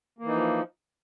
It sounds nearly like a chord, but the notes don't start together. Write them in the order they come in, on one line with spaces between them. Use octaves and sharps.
A#3 E3 D#4 F3